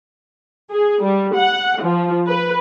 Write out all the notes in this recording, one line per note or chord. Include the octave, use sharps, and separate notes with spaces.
G#4
G3
F#5
F3
B4